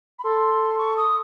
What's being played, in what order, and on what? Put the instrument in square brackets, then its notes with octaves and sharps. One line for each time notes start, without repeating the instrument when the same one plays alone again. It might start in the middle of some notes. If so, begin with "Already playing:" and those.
[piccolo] B5
[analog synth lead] A4 [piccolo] C6
[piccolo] C#6
D#6